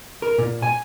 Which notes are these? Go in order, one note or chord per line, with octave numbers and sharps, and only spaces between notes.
A#4
A#2
G#5